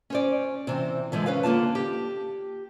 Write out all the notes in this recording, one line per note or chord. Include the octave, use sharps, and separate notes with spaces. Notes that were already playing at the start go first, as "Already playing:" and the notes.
C#4 C5 D5
C3 E3 C4
D3 E3 F3 G#3
C#4 B4 F5
D3 A#3 F4 A5
G4